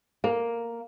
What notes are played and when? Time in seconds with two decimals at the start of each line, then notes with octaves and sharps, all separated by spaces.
0.24 A#3